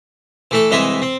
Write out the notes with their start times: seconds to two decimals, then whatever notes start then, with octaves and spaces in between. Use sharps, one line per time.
0.51 E3 A3 A4
0.71 C2 E3 G#3 D#5 E5
1.02 C4